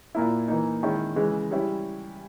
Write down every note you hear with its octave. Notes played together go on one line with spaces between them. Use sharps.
A#2 A#3 E4
E3 A#3 D#4
D#3 G#3 C#4 E4
C#3 E3 G#3
G3 C#4 E4